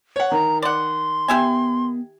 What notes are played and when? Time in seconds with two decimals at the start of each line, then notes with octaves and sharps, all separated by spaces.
0.16 C#5 F#5
0.31 D#3 A#5
0.62 D5 F#5 C6
1.28 B3 G4 E5 G#5